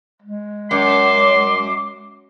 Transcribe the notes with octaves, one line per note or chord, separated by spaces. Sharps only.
G#3
F#2 C6 D6